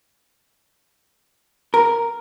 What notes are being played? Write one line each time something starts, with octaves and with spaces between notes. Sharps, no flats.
A#4